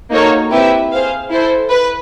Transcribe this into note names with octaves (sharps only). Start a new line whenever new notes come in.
A#3 D#4 F#4 A4 C#5
C4 E4 G4 B4 E5
G#4 C5 F5
E4 A4 C5
B4